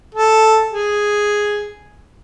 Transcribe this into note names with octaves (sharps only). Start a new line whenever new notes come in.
A4
G#4